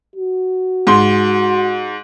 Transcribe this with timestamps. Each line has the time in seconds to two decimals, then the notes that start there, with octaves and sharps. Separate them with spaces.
0.16 F#4
0.87 G#2 C6